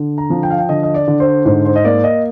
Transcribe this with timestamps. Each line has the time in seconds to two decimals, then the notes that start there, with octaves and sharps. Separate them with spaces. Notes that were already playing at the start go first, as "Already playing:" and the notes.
Already playing: D3
0.18 A#5
0.30 F3
0.43 G5
0.50 F5
0.58 G5
0.69 D3 D#5
0.83 D#5
0.94 D5
1.08 D3
1.20 C5
1.45 G#2 C5
1.65 C5
1.76 D#5
1.84 A#3 D5
2.04 D#5